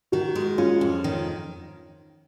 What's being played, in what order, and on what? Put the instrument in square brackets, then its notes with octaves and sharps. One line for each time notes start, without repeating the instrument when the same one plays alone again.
[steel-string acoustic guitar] D#3 [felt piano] F#4
[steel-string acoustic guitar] G#3
[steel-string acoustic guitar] C#4 [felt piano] F4
[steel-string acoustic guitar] F2
D#3